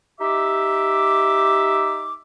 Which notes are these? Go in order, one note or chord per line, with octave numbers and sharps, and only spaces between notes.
D#4 G4 E5 D6